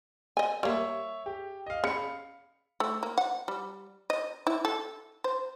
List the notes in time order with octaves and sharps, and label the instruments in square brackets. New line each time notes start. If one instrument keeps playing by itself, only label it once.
[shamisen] D#5 G#5
[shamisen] G3 A#3 [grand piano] C#5 E5
[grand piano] G4
D#5 F5
[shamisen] C#3 [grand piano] F5 B5 C#7
[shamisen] A3
A#3
F#5
G3
D#5
E4
A4
C5